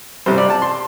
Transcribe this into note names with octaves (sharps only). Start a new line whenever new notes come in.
C3 G3 C5
D5
A5
C6